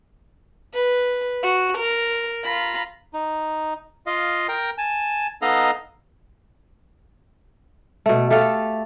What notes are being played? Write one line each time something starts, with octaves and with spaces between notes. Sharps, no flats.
B4
F#4
A#4
F4 A#5 B5
D#4
F4 D#5 F5
A#4 G5 A#5
G#5 A5
B3 D#4 A4 D#5 F5 A#5
B2 A3
A3 G4 A4 F5